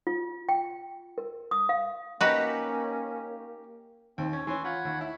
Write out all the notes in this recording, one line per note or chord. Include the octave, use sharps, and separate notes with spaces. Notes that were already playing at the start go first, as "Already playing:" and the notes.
F4
G5
A#4
D#6
F5
A#3 C#4 D#4 F#4 G4 B4 A#5
D#2 C4
C#4 C#5
E3 C#4 G#5 C6
F4 C#5 F#5 B5
D#2
E4